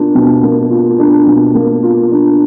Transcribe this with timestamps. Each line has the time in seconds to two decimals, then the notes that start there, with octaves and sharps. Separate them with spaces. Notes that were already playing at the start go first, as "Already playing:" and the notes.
Already playing: B2 A#3 D4 F4
0.15 B2
0.43 A#3
0.70 F4
0.99 D4
1.27 B2
1.55 A#3
1.83 F4
2.11 D4